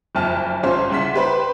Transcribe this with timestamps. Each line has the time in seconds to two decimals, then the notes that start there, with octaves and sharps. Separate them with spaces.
0.15 F#1 F2 A5 F6
0.63 G#1 C#4 F4 C5
0.90 C2 C#3 F#5 C6 B6
1.14 G4 B4 C5 B5